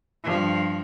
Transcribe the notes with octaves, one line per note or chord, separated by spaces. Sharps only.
G2 F3